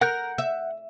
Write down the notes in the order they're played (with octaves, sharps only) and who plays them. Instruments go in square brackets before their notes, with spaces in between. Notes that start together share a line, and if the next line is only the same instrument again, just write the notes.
[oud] A#4 [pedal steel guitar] F#5 F#6 G6
[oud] E5